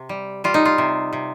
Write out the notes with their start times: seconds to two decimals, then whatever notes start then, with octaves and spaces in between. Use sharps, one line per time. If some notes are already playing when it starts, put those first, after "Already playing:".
Already playing: C3
0.09 G3
0.44 G3 F4
0.54 D#4
0.65 F4
0.78 C3
1.13 C3